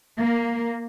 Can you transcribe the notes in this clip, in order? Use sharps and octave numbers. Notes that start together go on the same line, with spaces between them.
A#3